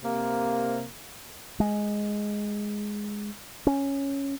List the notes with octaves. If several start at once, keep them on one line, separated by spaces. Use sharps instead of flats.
C3 A#3
G#3
C#4